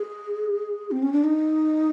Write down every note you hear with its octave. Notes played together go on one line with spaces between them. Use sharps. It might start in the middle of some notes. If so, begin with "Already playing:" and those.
Already playing: G#4
C4
C#4
D4
D#4